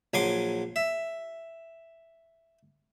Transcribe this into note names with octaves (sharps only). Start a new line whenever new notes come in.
A#1 F#3 G#5 C6 D6
E5